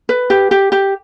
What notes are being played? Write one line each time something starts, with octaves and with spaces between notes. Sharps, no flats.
B4
G4
G4
G4